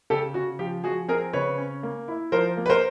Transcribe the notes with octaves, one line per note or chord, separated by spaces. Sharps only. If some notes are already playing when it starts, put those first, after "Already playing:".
C#3 G4 A4
C#3 F#4
F3 G4
F3 F#4 G#4
C4 G#4 A#4
C#3 B4 C#5
C#4
A#3
E4
F3 A#4 C5
A#3
B4
A#4 C5